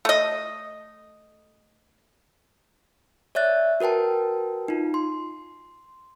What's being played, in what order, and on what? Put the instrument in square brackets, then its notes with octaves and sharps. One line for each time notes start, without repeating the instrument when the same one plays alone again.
[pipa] A3 D#5
[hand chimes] C#5 D5 E5 F#6 A6
F#4 A#4 B4 G5 A5
D#4 F4
C6